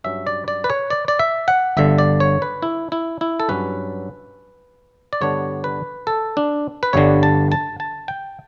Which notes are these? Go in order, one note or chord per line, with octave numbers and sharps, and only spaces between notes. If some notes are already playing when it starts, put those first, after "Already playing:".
G2 F#3 C#4 E5
D5
D5
B4
C#5
D5
D5
E5
F#5
G1 G2 D3 E5
D5
C#5
B4
E4
E4
E4
A4
G2 F#3 C#4 B4
D5
G2 D3 G3 B3 D4 C#5
B4
A4
D4
B4
G1 G2 D3 G3 C#5
A5
A5
A5
G5